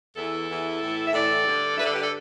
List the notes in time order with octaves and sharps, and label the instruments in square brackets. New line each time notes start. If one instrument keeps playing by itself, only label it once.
[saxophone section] E2 E3 E4 A4
E2 E3
A2 E3
E5
A2 E3 A4 D5
G2 D3
G2 D3 B4 E5
A4 D5
G4 B4
A4 D5